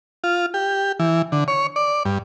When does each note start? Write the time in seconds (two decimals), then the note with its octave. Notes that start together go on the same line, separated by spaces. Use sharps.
0.24 F4
0.54 G4
0.99 E3
1.32 D3
1.48 C#5
1.76 D5
2.05 G2